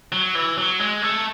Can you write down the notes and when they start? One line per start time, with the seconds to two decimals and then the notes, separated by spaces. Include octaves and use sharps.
0.12 F#3
0.35 E3
0.58 F#3
0.80 G#3
1.02 A3